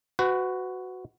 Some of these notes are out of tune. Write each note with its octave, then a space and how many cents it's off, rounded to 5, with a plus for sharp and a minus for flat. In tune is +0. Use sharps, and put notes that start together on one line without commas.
F#4 +0 B4 +35